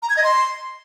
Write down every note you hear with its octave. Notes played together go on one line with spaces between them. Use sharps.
A#5
G#6
D#5
C6